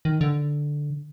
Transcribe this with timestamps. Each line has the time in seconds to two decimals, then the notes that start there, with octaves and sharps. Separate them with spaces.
0.05 D#3
0.21 D3